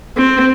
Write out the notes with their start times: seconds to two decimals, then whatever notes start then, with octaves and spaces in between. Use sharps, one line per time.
0.18 C4